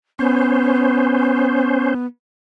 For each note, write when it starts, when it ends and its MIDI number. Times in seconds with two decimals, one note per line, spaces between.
0.19 2.06 59
0.19 1.94 61
0.19 1.94 72